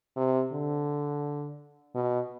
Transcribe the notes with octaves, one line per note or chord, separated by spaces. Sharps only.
C3
D3
B2